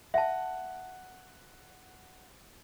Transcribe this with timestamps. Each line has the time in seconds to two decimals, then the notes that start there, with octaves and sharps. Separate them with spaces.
0.14 E5 F#5 A5